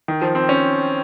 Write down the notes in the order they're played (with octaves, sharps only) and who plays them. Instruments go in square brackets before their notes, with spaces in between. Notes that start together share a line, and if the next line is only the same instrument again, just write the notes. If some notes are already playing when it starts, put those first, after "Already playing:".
[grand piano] D#3
F3
C4
C#4